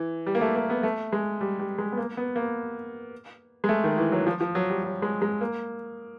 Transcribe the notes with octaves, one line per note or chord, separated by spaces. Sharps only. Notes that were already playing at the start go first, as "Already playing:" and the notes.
Already playing: E3
G3
A#3
A3
A#3
B3
A3
G#3
G3
G3
G#3
B3
A#3
B3
A#3
G#3
A3
D#3
E3
F#3
F3
F3
F#3
G3
F#3
G#3
G#3
A#3